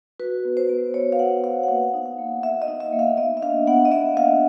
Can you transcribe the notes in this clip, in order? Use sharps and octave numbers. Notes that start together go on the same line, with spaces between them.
F#4 B4
B3
C5
B3
B3 C#5
F5
B3 F#5
B3 F5
F#5
A#3 F5
D#4
F5
A#3
A#3 E5
D#5
D#4
E5
A#3
F5
B3 D#5
E5
D4 F5
B3 F#5
D#5
B3 E5
B3 F5